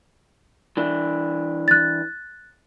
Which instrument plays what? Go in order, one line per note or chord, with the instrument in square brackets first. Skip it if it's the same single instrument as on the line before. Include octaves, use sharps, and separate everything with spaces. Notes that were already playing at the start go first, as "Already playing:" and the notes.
[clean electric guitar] E3 D4
[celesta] F#6 A6